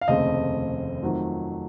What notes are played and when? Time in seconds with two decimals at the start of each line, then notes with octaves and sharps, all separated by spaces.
0.01 F5
0.08 F1 D#2 C#3 A3 C4 D#5
1.02 F2 D#3 F#3 A3